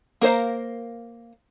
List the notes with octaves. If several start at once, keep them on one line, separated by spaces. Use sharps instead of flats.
A#3 A#4 C5 F5